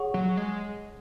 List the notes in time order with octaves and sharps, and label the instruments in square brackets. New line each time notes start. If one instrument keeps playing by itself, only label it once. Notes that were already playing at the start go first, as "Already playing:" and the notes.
Already playing: [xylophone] G#4 C#5 F#5 C#6
[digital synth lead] F#3
G#3